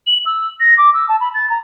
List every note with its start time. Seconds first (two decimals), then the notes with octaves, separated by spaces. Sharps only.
0.07 F#7
0.26 E6
0.60 A#6
0.78 D6
0.94 E6
1.09 A5
1.20 B5
1.34 A6
1.50 A#5